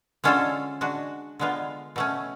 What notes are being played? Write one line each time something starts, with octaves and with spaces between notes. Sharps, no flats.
D3 G#3 C#4 F4 A4
G#3 D4 F#4
D3 G#3 B3 F4
B2 A3 C#4